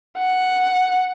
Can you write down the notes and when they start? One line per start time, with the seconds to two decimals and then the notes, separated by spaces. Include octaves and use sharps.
0.18 F#5